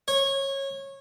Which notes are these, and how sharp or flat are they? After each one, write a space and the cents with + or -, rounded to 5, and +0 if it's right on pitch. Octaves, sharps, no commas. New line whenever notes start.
C#5 -20